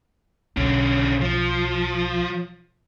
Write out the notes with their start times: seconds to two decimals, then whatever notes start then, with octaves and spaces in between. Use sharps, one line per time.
0.57 B1 D3 C#4
1.21 F3